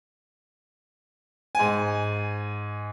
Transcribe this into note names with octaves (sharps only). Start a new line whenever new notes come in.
G#2 G#5